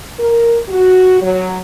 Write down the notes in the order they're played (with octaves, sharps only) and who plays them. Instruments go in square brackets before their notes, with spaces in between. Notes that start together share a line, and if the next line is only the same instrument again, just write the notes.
[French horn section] A#4
F#4
F#3